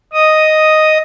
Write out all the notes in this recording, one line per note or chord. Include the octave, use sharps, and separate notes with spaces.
D#5 D#6